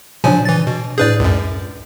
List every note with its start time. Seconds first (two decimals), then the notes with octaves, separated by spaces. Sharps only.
0.24 A#2 C#3 F3 F#3 D4 G#5
0.45 E3 A6
0.67 B2
0.98 A2 D4 G#4 B4 D5 G6
1.20 C#2 F#2